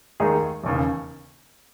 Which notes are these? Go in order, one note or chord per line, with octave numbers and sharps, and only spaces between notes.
D#2 D#3 G#3 D#4 G#4
E1 D#2 C#3